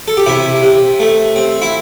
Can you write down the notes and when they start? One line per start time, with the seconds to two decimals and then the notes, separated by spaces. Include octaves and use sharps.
0.08 A4
0.17 G4
0.26 C3 E4
0.63 C3
1.00 A3
1.36 C4
1.62 E4